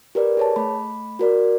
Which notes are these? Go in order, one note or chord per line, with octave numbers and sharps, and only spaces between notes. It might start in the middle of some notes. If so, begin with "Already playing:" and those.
G4 A#4 B4 D5
G#4 C#5 A5
A3 B5
F#4 A#4 D5